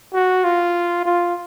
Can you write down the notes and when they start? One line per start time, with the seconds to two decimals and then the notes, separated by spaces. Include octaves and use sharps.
0.13 F#4
0.44 F4
1.05 F4